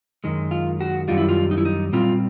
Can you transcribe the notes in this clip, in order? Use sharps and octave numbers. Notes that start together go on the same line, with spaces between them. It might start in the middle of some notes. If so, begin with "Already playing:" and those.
F#2 D#3 G#3
F4
F#4
F#2 D#3 G3 F4
E4
F4
D#4
E4
D#4
A#2 G3 C4 F4